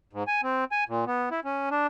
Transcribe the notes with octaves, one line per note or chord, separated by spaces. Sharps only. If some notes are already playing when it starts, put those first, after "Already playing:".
G#2
G#5
C4
G#5
A#2
B3
E4
C#4
D4